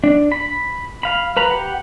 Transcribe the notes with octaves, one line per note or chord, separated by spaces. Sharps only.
D4
B5
F5 B5
B4 A#5 B5
G4 F#5